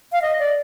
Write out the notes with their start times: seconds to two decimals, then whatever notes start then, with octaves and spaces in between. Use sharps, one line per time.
0.12 F5
0.22 D#5
0.39 D5